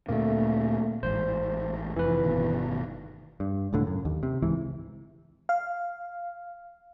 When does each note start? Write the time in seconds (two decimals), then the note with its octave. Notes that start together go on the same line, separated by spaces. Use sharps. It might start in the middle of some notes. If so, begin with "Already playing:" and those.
0.08 D2 A#2 A3 A#3 C4
1.03 A1 G#2 C5
1.96 F1 F2 E3 B4
2.23 G1 B2 D#3
3.40 G2
3.73 C#2 A2 D3
3.87 F#2
4.05 D#2
4.23 C3
4.42 C#2 G#2 E3
5.49 F5